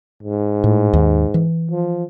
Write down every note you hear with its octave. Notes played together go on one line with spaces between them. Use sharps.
G#2
A2
D#2
E3
F3